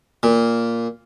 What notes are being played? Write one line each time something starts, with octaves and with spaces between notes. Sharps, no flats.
A#2